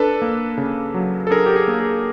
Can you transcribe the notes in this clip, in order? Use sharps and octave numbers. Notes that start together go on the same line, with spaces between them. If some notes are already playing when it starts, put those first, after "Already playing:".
Already playing: D4 A4 B4
A#3
C#3
F#3
A4
D4 G#4 A#4
G4
G#4
A#3
G#4